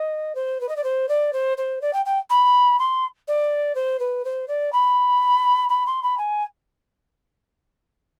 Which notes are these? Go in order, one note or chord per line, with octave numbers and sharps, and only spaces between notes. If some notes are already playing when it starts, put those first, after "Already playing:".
Already playing: D#5
C5
B4
D#5
D5
C5
D5
C5
C5
D5
G5
G5
B5
C6
D5
C5
B4
C5
D5
B5
B5
C6
B5
G#5